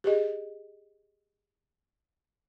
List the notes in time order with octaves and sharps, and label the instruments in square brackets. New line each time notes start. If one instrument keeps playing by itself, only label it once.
[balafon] G4 G#4 D#5